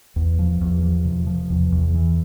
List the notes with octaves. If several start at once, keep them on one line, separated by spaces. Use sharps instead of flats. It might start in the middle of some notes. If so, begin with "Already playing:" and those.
E2
F3
E2
F3
C3
F3
E2
E2
E3